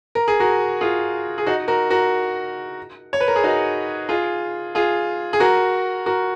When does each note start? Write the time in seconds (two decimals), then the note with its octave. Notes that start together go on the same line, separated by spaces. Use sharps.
0.15 A#4
0.28 G#4
0.40 F#4 A#4
0.81 F4 G#4
1.38 G#4
1.47 D#4 F#4
1.68 F#4 A#4
1.90 F#4 A#4
3.13 C#5
3.20 B4
3.28 A#4
3.36 G#4
3.44 D#4 F#4
4.09 F4 G#4
4.75 F4 G#4
5.33 G#4
5.40 F#4 A#4
6.06 F#4 A#4